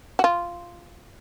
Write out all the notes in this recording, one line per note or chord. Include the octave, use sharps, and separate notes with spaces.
F#4
F4